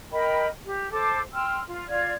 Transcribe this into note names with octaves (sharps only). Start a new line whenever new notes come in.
A#4 D#5 G5 B5
G4
A4 C5 D6
G5 C6 E6 F6
F4
F4 D5 F5 G#6